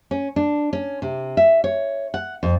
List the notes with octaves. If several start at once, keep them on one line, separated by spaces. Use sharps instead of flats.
C#4
D4
C#4
C3
E5
C#5
F#5
F2